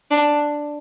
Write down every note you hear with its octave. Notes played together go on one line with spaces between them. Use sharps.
D4